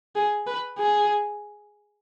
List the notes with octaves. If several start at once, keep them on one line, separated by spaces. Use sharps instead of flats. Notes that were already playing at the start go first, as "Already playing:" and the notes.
G#4
B4
G#4